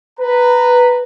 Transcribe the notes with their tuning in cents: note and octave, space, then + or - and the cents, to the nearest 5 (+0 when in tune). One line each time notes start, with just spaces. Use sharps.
B4 +0 A#5 -15